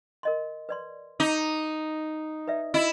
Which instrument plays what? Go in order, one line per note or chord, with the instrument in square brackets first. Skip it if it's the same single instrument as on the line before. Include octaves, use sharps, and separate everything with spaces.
[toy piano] A#4 D#5 C6
B4 D5 C6
[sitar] D#4 [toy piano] A#5 D6
[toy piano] B4 D5 E5
[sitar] E4 [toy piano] F#4 D#5